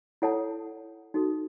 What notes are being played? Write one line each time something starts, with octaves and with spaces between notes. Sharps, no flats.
E4 A4 C#5 F#5 A5
D#4 F#4 A4